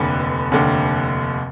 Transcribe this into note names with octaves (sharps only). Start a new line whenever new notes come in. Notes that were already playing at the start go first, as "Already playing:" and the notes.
Already playing: F1 D#2 D3 B4
F1 D#2 D3